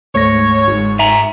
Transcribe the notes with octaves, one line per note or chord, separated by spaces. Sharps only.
D2 G#2 A3 C#5 A#6
G1
E5 G#5 A#5